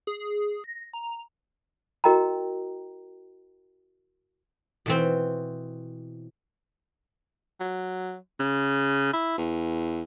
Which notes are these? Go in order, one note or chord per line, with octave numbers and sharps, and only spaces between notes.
G#4
A#6
A#5
E4 F#4 A#4 D#5 G5 A#5
B2 E3 C4
F#3
C#3
E4
E2